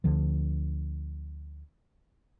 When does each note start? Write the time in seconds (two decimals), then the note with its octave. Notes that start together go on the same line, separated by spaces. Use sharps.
0.04 D2 D3 F3